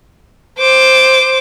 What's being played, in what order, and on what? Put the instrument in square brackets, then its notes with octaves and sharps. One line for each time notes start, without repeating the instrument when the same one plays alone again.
[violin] C5 D6